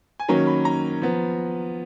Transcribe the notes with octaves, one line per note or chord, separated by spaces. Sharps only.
G#5
D#3 F#3 A#3 C#4 A#5
B5
A#5
F3 B3